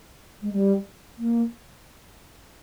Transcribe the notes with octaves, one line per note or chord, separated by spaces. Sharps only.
G#3
G3
A#3